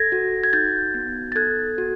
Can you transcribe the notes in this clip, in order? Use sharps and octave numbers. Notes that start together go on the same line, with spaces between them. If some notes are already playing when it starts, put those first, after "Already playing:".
Already playing: A4 G#6 A#6
F#4
G#6
D#4 G6 A6
B3
A6
A4 F#6 G#6
F#4